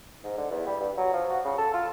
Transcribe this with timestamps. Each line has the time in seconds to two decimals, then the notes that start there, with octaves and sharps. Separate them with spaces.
0.24 G#2
0.38 D3
0.51 E2
0.67 G3
0.80 G2
0.97 F#3
1.14 F3
1.30 F#4
1.45 C#3
1.58 A4
1.74 F4